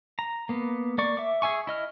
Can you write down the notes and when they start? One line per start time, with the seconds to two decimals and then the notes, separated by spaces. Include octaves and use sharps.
0.19 A#5
0.49 A#3 B3
0.98 A#3 D5 C#6
1.17 E5 D6
1.42 G#4 E5 G#5 C#6
1.67 E4 D#5 F6